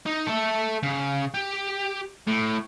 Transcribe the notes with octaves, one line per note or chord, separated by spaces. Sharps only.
D#4
A4 E5
C#3
G4
A2